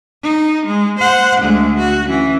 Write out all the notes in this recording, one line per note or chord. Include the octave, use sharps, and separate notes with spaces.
D#4
G#3
C5 F#5
D2 G#3
F#4
E3 C#4